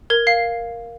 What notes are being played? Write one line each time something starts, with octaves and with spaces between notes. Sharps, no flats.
A#4 G#6
F5 C7